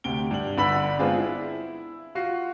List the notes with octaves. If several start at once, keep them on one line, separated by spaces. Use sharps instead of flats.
D2 C3 D7 G7
G2 F#7
G1 D3 B5 E6 B6 F#7
G#3 B3 C4 D4 F4 G#4
E4
F4 F#4 C7